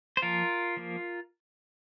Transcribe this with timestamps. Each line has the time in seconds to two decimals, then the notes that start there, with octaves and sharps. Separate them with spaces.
0.17 C5
0.22 F3 A#3 F4 A#4
0.77 F3 A#3